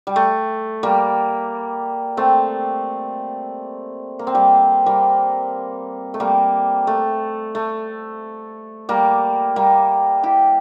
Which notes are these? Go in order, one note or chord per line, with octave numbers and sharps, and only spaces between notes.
G3
A3
G3 A#3
A3 C4
A#3
C4
G3 A#3
G3 A#3
A3
G3 A#3
A3
A3
G3 A#3
G3 A#3
E4 G4